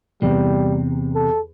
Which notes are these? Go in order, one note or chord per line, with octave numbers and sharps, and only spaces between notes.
E2 C3 G3
A4